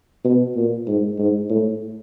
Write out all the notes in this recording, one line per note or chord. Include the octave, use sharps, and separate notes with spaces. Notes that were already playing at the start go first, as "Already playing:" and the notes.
B2
A#2
G#2
G#2
A2